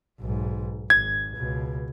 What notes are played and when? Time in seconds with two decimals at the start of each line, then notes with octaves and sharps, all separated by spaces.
0.20 B1 G#2
0.90 G#1 G#6
1.36 C#2 B2